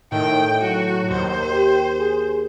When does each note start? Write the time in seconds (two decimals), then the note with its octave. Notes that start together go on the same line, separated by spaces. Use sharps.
0.12 A2 D#3 G5
0.62 F#3 F#4
1.11 D#2 C5
1.52 G4
1.99 G#4